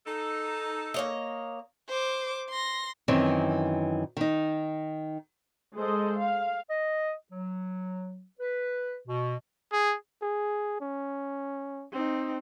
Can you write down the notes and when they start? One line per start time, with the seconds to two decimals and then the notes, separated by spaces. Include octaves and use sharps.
0.07 D#4 A4
0.94 A#3 C#5 D#5
1.89 C5 D6
2.50 C6 A#6
3.08 F#2 D#3 E3 C4
4.17 D#3 D#4
5.77 G#3 A4 C5 D#5
6.17 F5
6.70 D#5
7.31 F#3
8.40 B4
9.08 B2
9.73 G#4
10.22 G#4
10.81 C#4
11.93 C4 D#4